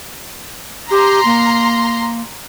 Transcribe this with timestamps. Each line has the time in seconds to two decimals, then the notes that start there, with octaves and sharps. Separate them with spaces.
0.91 G4 A#5 C6
1.25 A#3